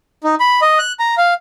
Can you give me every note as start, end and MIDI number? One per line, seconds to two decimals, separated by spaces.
0.24 0.35 63
0.40 0.60 83
0.62 0.78 75
0.79 0.93 90
1.00 1.15 82
1.17 1.34 77